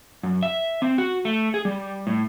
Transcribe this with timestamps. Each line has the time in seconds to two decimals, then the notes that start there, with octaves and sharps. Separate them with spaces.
0.23 F#2
0.43 E5
0.82 C4
0.98 F#4
1.25 A3
1.54 G#4
1.65 G3
2.07 A2